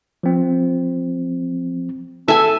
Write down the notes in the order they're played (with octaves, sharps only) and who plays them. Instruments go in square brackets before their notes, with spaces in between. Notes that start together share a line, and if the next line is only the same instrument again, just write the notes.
[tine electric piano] F3 C4
[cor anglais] A4 [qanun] E5 G#5